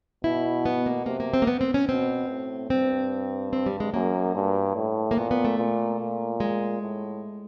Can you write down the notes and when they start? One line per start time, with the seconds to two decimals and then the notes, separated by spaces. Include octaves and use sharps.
0.24 B2 E4
0.66 B3
0.86 A#3
1.06 C3 A#3
1.20 A#3
1.34 C4
1.42 A#3
1.47 B3
1.61 C4
1.74 C#4
1.89 B2 C4
2.29 A2
2.70 G2 C4
3.53 C4
3.66 G3
3.80 G#3
3.94 F#2 A#3
4.35 G2
4.76 A2
5.11 A#3
5.17 A#2 B3
5.31 B3
5.45 A3
5.58 A#2
6.00 A#2
6.40 G#3
6.81 A2